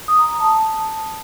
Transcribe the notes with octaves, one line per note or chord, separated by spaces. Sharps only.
D#6
A#5
D#6
A5